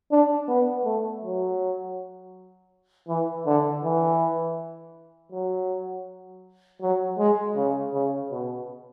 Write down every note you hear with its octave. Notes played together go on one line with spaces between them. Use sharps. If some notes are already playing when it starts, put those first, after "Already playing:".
D4
B3
A3
F#3
E3
D3
E3
F#3
F#3
G#3
C#3
C#3
B2